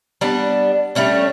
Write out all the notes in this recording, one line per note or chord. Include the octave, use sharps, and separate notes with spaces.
G3 B3 D4
G3 A3 C#4 D4